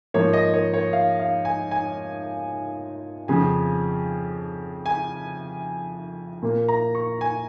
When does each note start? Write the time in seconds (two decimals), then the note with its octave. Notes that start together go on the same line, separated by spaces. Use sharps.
0.14 G#2 F3 A#3 C#5
0.33 D#5
0.54 C#5
0.74 C#5
0.93 F5
1.19 F5
1.45 G#5
1.71 G#5
3.28 F2 C#3 F3 G#5
4.86 G#5
6.42 A#2 A#3
6.68 A#5
6.95 C#6
7.21 G#5